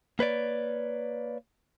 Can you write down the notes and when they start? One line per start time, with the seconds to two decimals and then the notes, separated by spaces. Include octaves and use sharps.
0.19 A#3 B4 C#5 D5